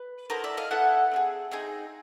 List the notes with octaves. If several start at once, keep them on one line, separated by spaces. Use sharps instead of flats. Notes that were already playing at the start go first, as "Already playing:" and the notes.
Already playing: B4
B3 E4 A4 A#4 C5
D5 E5
D#5 F5
B3 E4 A4 E5 F#5
C4 D#4 G#4
C4 D#4 G#4